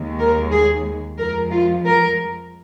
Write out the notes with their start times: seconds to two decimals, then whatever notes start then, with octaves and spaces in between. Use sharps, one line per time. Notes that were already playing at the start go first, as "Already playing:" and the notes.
Already playing: D#2 D#3 G#3
0.19 A#4
0.51 G#4
1.18 F2 F3 G#3 A#4
1.51 F4
1.85 A#4